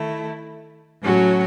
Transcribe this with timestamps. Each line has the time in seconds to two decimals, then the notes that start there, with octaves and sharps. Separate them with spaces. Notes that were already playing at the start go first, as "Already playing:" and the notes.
Already playing: D#3 A3 E4
1.02 A2 F#3 C#4 F#4